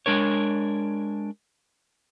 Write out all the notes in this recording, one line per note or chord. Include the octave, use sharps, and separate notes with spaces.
G#3 D4 A#4 C#5